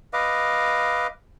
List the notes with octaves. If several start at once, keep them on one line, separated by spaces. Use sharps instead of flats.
B4 D#5 F5 D6